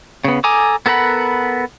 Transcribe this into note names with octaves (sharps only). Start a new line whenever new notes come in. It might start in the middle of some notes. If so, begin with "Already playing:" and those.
C#3 B3
A4 G#5 A#5 D6 D#6
B3 A4 A#4 F#5 B5